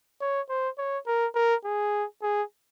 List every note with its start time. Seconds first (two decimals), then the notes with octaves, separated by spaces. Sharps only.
0.21 C#5
0.49 C5
0.78 C#5
1.07 A#4
1.35 A#4
1.65 G#4
2.22 G#4